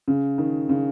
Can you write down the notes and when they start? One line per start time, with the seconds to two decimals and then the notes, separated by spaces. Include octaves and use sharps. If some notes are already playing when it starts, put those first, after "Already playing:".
0.08 C#3
0.38 D#3
0.69 C#3